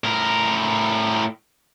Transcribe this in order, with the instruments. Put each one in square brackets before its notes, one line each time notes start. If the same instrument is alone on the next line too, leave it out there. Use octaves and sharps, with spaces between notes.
[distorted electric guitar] A2 A#4